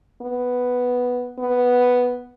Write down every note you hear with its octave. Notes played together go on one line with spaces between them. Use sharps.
B3
B3